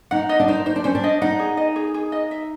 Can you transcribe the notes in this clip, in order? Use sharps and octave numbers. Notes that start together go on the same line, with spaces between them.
D#4 F#5
D#5
D4
D#4 C5
D#4 C5
D4
C#4 C5
D4
D#5
D#4 F#5
G#4
D#5
G#4
G#4
D#5
E5